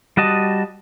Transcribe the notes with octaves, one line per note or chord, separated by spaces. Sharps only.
G3 F#4 D#5 A5